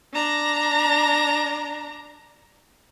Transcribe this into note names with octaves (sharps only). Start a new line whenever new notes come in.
D4 A#5